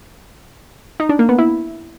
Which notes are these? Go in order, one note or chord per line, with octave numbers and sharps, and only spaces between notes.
D#4
D4
A#3
B3
E4